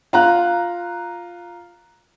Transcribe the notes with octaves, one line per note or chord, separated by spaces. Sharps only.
F4 A#5 F#6